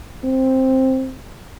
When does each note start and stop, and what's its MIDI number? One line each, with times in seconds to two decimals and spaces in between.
0.24 1.13 60